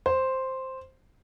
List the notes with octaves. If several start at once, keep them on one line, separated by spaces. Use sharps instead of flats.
C5